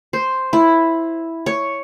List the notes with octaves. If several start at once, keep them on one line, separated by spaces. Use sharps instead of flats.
C5
E4
C#5